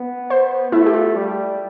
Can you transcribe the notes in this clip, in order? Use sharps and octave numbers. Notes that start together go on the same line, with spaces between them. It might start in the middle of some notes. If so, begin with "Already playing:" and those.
Already playing: B3
C5
A3 E4
G4
F4
G3